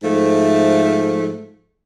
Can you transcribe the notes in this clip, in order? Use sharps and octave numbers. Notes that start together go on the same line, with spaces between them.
G#2 F3 A3